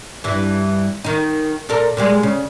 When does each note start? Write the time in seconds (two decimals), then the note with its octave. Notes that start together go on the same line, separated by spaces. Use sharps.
0.24 G2 E3
1.04 D#3 D#4
1.69 A#2 A4 A#4
1.97 A#2 G3 G#3
2.23 C#3